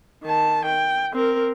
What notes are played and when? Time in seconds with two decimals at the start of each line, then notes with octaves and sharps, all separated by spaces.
0.24 D#3 A5
0.65 G5
1.13 C4 A#4